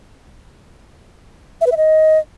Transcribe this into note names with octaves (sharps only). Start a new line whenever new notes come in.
E5
B4
E5
D#5